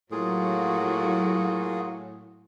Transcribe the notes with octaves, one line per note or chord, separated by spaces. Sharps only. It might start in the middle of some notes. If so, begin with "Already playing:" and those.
A2 F#3 A#3 F4 F#4 G#4